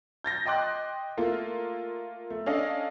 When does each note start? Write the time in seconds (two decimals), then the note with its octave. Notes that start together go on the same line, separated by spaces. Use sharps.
0.24 G6 A6 A#6
0.46 D#5 G5 C6 D6 F#6
1.17 A3 A#3 F4
2.30 A3
2.46 C#4 D4 A4 D#5 F5